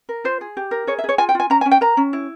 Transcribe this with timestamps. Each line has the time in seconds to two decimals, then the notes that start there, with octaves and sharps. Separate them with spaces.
0.09 A#4
0.24 F4 C5
0.41 G#4
0.57 G4
0.71 A#4
0.87 G#4 C#5
0.99 E5
1.04 G#4 C#5
1.18 F4 G#5
1.29 G5
1.35 F4 G#5
1.50 C#4 A#5
1.61 G#5
1.66 C#4
1.71 G5
1.81 A#4 A#5
1.97 C#4
2.13 E4